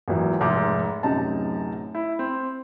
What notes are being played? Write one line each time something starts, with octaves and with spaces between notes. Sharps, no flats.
G#1 A#2 E3 F#3
F1 G#2 D6
D1 F#2 C3 D#4 A5 A#5
E4
C4